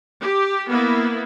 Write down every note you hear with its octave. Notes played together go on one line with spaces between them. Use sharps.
G4
A#3 B3 E4